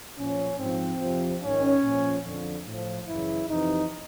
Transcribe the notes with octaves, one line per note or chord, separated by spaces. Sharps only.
A#2 F3 C#4
G#2 F3 C4
F2 C3 F3
G#2 D#3 C#4
A#2 F3
F2 D3 F3
A2 F3
F#2 C#3 E3 E4
F2 C3 E3 D#4